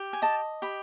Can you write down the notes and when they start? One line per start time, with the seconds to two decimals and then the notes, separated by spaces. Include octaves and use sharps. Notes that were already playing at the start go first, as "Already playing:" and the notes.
Already playing: G4
0.13 G#5
0.22 D#5 A5
0.62 G4 B5